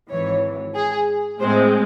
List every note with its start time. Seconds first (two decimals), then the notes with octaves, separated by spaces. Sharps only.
0.11 G#1 G#2 E3 C#5
0.75 G#4
1.40 A2 G#3 C4 C5